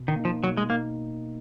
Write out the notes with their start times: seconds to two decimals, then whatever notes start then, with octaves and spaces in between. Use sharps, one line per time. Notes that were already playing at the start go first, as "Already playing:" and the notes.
Already playing: B2
0.08 D#3
0.16 A#3 D#4
0.25 F3
0.43 B2 F#3
0.57 G#3
0.70 A#3 D#4